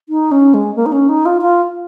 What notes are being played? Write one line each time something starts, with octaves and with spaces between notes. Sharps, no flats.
D#4
C#4
G#3
A#3
D#4
C#4
D#4
F4
F4